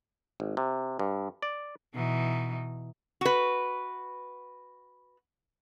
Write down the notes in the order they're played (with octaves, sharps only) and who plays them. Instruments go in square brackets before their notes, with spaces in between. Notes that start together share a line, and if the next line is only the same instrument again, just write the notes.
[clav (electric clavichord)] G#1
C3
G2
D5
[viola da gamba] B2 E3 D#4
[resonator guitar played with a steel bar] F#4 B4